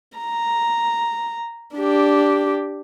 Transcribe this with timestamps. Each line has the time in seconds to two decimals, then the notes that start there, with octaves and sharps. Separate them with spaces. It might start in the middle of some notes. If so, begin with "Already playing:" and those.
0.17 A#5
1.76 D4 G4